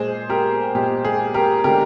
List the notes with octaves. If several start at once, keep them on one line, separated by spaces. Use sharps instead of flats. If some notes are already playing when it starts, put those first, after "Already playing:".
Already playing: A#2 G#3 G#4 C5
G4 A#4
A#2 G#3 G4
G#4
G4 A#4
D3 G#3 G4 A#4